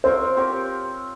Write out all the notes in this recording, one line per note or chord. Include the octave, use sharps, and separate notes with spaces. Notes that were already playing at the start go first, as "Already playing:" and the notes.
C4 F4 A#4 C5 C#5
C4 G4 A#4 C#5